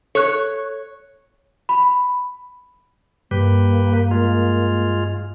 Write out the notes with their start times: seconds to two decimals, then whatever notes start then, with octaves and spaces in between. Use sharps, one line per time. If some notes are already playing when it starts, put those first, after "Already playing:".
0.15 A4 C#5 F#6
1.69 B5
3.31 G2 A#3 G4 B4
4.11 G#3 F4